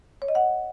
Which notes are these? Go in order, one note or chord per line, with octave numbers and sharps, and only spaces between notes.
C#5
D#5
F#5